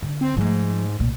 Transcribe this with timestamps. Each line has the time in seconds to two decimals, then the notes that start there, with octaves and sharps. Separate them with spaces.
0.02 D3
0.21 C4
0.37 G#2 F3 A3
0.99 C2 A#2